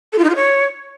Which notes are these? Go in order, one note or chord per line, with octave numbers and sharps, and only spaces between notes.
A4
F4
D#4
F4
C#5